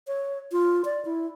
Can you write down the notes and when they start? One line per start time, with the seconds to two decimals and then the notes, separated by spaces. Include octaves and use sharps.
0.07 C#5
0.52 F4
0.85 D5
1.05 E4